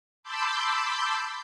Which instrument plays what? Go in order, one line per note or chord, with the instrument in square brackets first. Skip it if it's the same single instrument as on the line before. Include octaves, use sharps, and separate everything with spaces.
[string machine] A5 B5 C6 D6 E6 G6